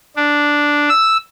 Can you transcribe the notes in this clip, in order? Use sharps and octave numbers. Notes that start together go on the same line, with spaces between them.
D4
E6